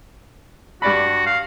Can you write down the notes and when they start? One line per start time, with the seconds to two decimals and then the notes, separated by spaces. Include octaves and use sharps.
0.82 G2 F#4 D5 B5
1.26 F5